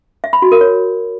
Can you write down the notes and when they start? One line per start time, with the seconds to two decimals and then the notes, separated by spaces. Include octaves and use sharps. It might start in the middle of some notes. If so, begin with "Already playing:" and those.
0.24 E5
0.33 B5
0.42 F#4
0.52 A#4
0.61 C#5